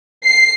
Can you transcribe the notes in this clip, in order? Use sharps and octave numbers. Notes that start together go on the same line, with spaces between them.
C7